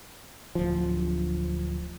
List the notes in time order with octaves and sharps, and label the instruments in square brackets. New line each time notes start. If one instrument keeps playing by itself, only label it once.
[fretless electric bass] D1 F3